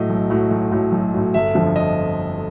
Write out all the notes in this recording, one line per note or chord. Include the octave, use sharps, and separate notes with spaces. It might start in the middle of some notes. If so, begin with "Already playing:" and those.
Already playing: A2 F#3 D#5
B1
A2 F#3
B1
A2 F#3
B1
A2 F#3
G1 E5
F2 D3 F3
D#5